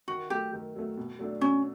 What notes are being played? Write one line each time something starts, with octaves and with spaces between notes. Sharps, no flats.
D#3 F#4
F#3 A3 G4
D#3
F#3 A3
B2
F#3 A3 D4
B2 C#4